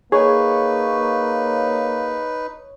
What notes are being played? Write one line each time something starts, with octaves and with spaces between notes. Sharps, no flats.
A#3 D#4 G#4 B4 C#5